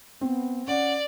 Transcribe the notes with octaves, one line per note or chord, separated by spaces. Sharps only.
B3 C4
C#4 D5 F#5